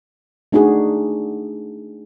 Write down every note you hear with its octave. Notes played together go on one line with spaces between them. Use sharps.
A3 D4 D#4 F#4 G#4